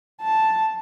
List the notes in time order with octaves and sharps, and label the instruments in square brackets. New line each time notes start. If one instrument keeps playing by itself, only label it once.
[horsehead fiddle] A5